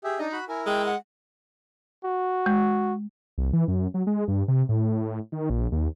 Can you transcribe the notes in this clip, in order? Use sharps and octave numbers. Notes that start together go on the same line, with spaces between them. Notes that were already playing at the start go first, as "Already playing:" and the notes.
G4 G#4 E5
D4 D#4 D#5
F#4 B5 F#6
E4 A#4 G#5
G#3 G5
F#5
F#4
G#3
C2
E3
F#2
F#3
G#3
G2
C3
A2
D#3
A#1
D#2